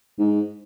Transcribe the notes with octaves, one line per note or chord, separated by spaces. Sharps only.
G#2